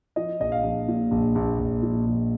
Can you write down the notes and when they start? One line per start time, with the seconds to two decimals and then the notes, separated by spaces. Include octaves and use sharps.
0.16 F3 D#5
0.40 A#1 D#5
0.52 F5
0.63 A#1
0.88 A#2
1.11 A#1
1.35 A#1
1.59 A#1
1.83 A#2
2.05 A#1